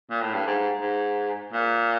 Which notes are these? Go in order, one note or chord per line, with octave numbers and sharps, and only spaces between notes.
A#2
A2
G2
G#2
G#2
A#2